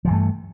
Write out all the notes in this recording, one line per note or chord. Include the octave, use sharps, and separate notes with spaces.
G2 E3 F3 A3